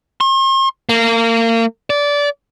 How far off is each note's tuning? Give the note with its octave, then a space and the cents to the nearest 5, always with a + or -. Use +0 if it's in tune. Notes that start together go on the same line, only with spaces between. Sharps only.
C6 +45
A#3 -30
D5 -20